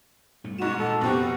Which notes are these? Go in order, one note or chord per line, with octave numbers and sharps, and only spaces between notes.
G2 B2 A3
G#2 F#4 E7
A#2 A4
F2 B2 C4 F#4 G4